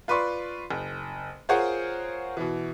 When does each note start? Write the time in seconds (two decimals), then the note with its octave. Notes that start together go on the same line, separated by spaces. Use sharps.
0.08 F4 B4 D5 C6 C#6
0.71 F#1
1.49 F4 G#4 A#4 C5 C#5 F#5
2.37 B2 E3